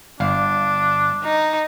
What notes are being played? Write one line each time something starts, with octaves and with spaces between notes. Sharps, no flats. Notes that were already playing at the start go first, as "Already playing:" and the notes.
G1 D4 F5
D#4